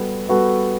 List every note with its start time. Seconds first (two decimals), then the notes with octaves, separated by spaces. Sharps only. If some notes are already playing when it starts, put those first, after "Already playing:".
Already playing: G3 B3 F#4 A4
0.29 G3 B3 F#4 A4